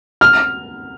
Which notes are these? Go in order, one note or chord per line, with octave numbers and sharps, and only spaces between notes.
F6